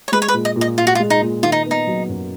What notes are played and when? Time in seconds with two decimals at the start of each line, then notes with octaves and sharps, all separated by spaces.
0.08 C#5
0.12 G#3 B4
0.22 C#5
0.28 B4
0.34 A#2
0.45 D#5
0.56 A#2
0.61 D#5
0.78 A#2 F4
0.87 F#4
0.95 F4
1.00 G#3
1.10 D#4
1.22 A#2
1.43 D#3 F4
1.52 D#4
1.66 B3
1.71 D#4
1.87 F#3
2.09 F#2